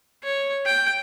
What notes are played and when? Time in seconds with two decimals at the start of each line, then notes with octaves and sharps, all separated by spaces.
0.24 C#5
0.66 G5